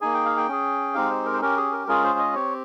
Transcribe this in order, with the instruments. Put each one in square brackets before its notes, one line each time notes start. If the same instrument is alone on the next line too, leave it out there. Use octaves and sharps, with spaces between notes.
[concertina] A#3 D#4 G#4 G#5
G5
F5
G5
C#4 G#4
G#3 C4 D#4 G4 F5
C5
A#4
C5
C#4 G4 A#4
G#4
A#4
G#3 C#4 F4 G#4 A#4
C5
D#5
C4 G4 C#5